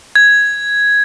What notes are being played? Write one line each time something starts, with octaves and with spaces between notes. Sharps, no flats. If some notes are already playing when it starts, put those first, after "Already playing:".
G#6